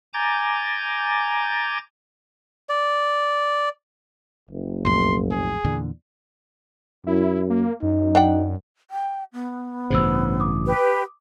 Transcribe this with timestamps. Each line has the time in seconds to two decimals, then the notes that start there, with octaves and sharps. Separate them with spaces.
0.13 G#5 A#5 D6 G6 A6
2.69 D5
4.50 F#1
4.85 B1 F2 A2 C6
5.31 G#4
5.64 E2 A#2 D3
7.07 F#2 E4
7.50 A#3
7.82 F#2 D#4
8.15 D4 F#5 G5
8.91 G5
9.33 B3
9.90 A1 G2 C#3 C5 E6
10.40 D6 D#6
10.66 G4 B4